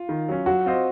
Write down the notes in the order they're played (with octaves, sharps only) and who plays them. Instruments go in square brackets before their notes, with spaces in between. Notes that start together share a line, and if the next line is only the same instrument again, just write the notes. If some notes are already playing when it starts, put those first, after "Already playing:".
Already playing: [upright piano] F4
[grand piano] D#3
F#3 C#4
[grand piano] F#3 [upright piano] F#4
[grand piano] C4 F4 C5 D#5